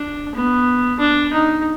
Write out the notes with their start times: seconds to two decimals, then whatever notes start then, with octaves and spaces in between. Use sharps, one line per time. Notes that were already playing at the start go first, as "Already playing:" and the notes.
Already playing: D4
0.34 B3
0.99 D4
1.33 D#4